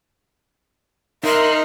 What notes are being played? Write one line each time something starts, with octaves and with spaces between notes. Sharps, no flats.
D#4 A#4 E5 C6 F#6